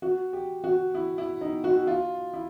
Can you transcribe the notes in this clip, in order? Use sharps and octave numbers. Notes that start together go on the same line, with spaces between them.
F#4
G4
F#4
E4
E4
D#4
F#4
F4
E4